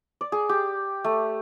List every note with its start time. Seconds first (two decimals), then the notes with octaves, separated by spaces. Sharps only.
0.21 D5
0.32 G#4
0.49 G4
1.04 A3